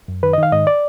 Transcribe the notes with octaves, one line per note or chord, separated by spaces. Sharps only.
F#2
D#3 B4
D#5
D#3 F5
G#2 D#5
D5